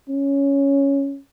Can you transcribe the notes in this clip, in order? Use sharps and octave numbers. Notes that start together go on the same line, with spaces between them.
C#4